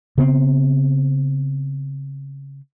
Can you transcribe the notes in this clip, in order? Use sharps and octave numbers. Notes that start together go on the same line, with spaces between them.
C#3 B3 C4